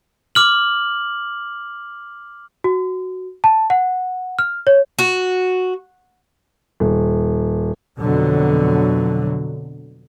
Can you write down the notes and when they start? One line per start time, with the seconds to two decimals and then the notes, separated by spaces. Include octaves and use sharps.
0.35 D6 F6 F#7
2.64 F#4
3.44 A5
3.70 F#5
4.39 F6
4.67 C#5
4.99 F#4
6.80 D#1
7.99 F2 B2 D3 F#3